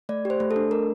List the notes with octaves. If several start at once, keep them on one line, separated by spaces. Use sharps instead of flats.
A3 D5
G4 C5
A3
A4
D4
A3 A#4